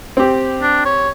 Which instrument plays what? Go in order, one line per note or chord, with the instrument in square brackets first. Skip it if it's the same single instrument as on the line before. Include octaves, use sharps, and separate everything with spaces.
[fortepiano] C4 G4
[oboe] D4
C#5